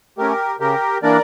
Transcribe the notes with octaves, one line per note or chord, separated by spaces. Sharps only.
A3 C#4 G4 A#4
C#3 G4 A#4
E3 A#3 D4 A#4 D5